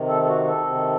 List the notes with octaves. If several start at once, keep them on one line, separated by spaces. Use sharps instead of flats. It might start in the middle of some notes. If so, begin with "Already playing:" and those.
Already playing: C3 D#3
A4
A4
F#4
A4
C3 D#3